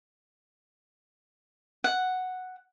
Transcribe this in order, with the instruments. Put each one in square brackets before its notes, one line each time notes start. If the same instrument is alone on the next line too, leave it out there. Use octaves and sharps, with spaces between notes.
[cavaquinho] F#5